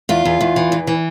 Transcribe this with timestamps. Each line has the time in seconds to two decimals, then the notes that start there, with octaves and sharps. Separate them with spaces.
0.09 E2 F4
0.25 E2
0.41 E2
0.56 E3
0.72 E2
0.87 E3